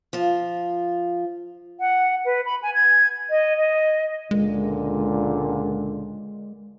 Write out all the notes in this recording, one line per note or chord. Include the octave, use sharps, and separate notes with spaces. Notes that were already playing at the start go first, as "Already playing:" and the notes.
F3 F4
F#5
B4
B5
G#5
G#6
D#5
D#5
C#2 A#2 D3 G#3